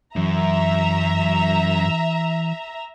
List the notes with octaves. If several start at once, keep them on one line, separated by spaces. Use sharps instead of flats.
F#2 E3 E5 A#5